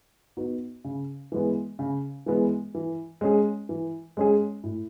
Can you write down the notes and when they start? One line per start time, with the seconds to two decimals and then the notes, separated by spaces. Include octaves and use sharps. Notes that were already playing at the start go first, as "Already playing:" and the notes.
0.37 B3 D#4 F#4
0.84 C#3
1.32 E3 G#3 B3
1.79 C#3
2.26 E3 G#3 B3
2.75 E3
3.21 G#3 C#4 G#4
3.69 E3
4.17 G#3 C#4 G#4
4.63 A2